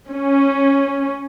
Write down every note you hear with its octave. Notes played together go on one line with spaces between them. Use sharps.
C#4